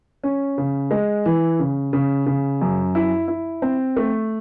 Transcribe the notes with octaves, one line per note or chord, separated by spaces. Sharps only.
C#4
C#3
G#3
E3
C#3
C#3
C#3
F#2
E4
E4
C4
A3